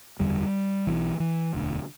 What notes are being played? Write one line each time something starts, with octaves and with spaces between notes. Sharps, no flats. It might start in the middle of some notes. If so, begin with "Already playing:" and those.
F#1 E2 D3 G3
B1 B2 E3
E3
E1 D2 D3